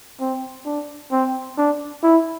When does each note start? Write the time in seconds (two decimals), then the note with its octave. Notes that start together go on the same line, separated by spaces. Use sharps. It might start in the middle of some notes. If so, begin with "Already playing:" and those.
0.20 C4
0.66 D4
1.12 C4
1.58 D4
2.03 E4